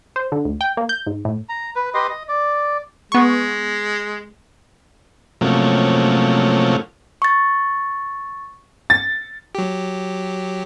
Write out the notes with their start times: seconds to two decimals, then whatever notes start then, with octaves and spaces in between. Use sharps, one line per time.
0.16 C5
0.32 D3
0.45 D2
0.61 G5
0.77 A#3
0.89 G6
1.07 G#2
1.25 A2
1.49 A#5
1.76 B4
1.94 G4 B4 D#5 C6
2.09 D#5
2.28 D5
3.12 G#3 B3 C#6
5.41 C3 F3 F#3 A3 A#3 C#4
7.22 C#6 A6
8.90 A6
9.55 F#3 G4